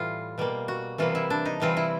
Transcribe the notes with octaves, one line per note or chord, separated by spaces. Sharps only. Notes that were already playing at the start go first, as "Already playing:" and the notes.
Already playing: A2 E3 G3 F4
B2 G3 A#3
F#4
C3 E3 G3 A#3 F4
E4
D4
D#4
C3 E3 G3 C4 F4
E4